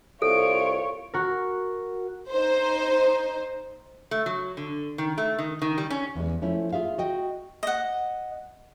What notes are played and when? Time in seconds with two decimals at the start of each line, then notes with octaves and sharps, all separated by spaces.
0.22 C2 F4 A4 C#5 D7
1.14 F#4 A#4
2.32 D#4 C5
4.11 A3
4.26 F#3
4.57 D3
4.98 D#3
5.18 A3
5.39 D#3
5.62 D#3
5.78 G3
5.90 C#4
6.15 E2 G#3
6.42 F3 A3 C#4 E4
6.73 F4 G#4 E5 F5
6.98 F#4 D#5 G5
7.63 D#5 F#5